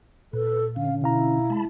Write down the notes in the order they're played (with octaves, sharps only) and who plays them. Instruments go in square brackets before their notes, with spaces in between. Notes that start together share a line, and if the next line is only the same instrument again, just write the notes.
[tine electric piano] A#2 [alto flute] A4 [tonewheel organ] B4
[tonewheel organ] D3 C#4 [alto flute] F5
[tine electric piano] B2 F5 A#5 [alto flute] E4
[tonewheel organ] G#3 A5 B5